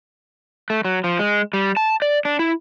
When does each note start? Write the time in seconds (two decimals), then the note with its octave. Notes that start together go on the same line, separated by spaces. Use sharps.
0.70 A3
0.85 F#3
1.04 F3
1.19 G#3
1.53 G3
1.77 A5
2.02 D5
2.25 D4
2.39 E4